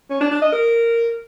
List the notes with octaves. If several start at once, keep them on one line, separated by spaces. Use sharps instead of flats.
C#4
D4
D4
D#5
A#4